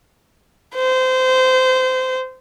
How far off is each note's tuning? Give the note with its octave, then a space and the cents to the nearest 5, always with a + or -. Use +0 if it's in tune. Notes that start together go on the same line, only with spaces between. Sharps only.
C5 -25